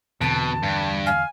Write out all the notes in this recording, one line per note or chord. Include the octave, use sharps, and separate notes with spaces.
E2 B2 D3 C4 A5
G2
F5 G#5